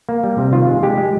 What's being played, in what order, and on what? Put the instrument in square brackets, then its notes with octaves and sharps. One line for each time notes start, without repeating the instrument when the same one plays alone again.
[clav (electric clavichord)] A#3
G3
C3
D#3 F4
G#3
G#3 G4
G#3